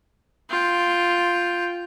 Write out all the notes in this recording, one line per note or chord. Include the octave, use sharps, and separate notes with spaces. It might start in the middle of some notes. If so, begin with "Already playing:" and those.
F4 G5